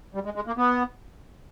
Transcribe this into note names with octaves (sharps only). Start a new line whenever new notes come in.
G3
G#3
G#3
A#3
B3